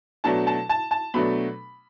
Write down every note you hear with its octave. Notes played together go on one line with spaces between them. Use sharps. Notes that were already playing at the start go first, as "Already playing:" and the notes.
B2 F#3 A3 D4 A5
A5
A5
A5
B2 F#3 A3 D4 B5